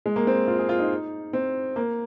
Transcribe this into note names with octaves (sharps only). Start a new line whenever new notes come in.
G#3
A#3
C4
F4
G#4
F4
D#4
C4
A#3